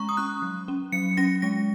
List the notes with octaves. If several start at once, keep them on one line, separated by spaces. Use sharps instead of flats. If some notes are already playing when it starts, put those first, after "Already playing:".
Already playing: G#3 C#4 A#5 C#6
D#6
C#4 F#6
F#3
C#4
F#3 C#7
C#4 A#6
G#3 A#6